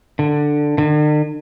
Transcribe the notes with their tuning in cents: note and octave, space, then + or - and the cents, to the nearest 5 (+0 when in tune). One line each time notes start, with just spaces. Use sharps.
D3 +10
D3 +45